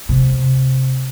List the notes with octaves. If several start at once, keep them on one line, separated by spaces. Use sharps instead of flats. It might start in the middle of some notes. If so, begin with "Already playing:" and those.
C3